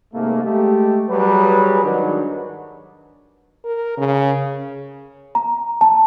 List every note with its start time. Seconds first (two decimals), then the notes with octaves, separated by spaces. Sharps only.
0.14 G#2 C3 A3 A#3
0.43 G#3 A3 G4
1.11 F#3 G3 G#4 B4
1.84 G#2 D#3 F#3 D4 D#4 F#4
3.65 A#4
3.97 C#3
5.35 A#5
5.81 A5